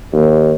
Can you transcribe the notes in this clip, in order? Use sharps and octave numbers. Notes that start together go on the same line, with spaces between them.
D#2